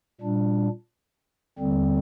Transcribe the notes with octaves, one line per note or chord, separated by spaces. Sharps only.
A#2 G3 D4
D#2 D3 G3 C4